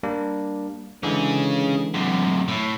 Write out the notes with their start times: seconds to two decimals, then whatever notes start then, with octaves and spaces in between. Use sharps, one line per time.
0.03 G3 A#3 D4
1.03 D3 E3 G#3 C#4 G#4
1.94 F#2 C3
2.48 A2